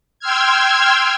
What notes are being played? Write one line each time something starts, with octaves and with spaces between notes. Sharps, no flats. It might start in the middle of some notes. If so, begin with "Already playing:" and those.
G5 C6 E6 F6 G#6